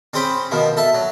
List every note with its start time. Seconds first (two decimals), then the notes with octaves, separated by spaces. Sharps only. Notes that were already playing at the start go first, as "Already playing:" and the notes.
0.13 C4 C#4 G#4 C5 G5 B5
0.51 B2 D#3 F3
0.77 A4 E5 A5
0.94 F#3